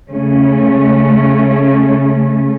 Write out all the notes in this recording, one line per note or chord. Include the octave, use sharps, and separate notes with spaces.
C#3 A3 C#4